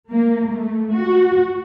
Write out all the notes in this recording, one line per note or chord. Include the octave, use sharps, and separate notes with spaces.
A#3
A3
F#4